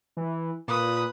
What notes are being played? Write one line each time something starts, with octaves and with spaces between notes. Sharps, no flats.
E3
A#2 B4 D#6